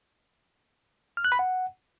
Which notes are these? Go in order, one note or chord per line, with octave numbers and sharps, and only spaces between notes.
F6
F#6
B5
F#5